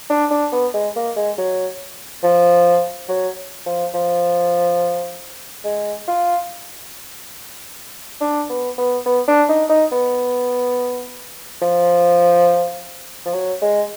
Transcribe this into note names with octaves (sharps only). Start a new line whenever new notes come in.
D4
D4
B3
G#3
A#3
G#3
F#3
F3
F#3
F3
F3
G#3
F4
D4
B3
B3
B3
D4
D#4
D#4
B3
F3
F3
F#3
G#3